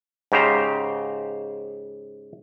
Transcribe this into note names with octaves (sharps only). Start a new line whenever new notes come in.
G#2 C#3 G4 C5 A#5